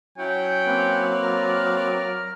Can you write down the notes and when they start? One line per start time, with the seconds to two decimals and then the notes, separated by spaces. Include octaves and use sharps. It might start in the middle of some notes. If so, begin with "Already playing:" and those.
0.18 F#3 C#4 E4 F#5 G5
0.67 A#3 C4 B4
1.22 A#4 D5 A#5 F6